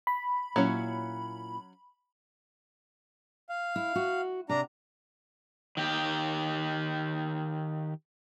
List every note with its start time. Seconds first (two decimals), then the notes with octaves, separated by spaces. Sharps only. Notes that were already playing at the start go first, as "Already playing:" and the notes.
0.07 B5
0.56 A#2 F#3 C#4 E4
3.49 F5
3.76 E4
3.96 F#4
4.49 C3 D4 A#5
5.77 D#3 G4